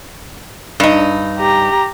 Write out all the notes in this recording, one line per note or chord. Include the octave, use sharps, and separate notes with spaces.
G2 D#4
G4 A#5